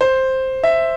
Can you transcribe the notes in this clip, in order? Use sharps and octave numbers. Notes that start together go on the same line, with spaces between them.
C5
E5